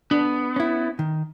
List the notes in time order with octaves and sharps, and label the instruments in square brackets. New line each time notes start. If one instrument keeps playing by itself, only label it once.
[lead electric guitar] B3 [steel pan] D4
[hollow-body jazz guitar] C#4 E4
D#3